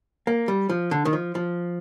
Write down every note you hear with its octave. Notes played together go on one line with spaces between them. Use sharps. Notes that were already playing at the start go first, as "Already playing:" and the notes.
A#3
G3
F3
D3
D#3
F3
F3